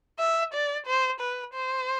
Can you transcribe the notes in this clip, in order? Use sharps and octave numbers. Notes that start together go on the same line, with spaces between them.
E5
D5
C5
B4
C5